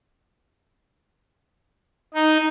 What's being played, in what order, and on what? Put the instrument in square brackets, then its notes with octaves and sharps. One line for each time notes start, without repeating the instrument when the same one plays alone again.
[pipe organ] D#4